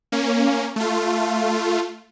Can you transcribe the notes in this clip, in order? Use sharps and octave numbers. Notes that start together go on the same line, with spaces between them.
A#3 C#4
A3 F4